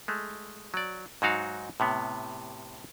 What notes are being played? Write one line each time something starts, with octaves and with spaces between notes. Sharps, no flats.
G#3 A3
F#3 D5
G#2 F#3 D#4 F#4 F5
A2 C3 B3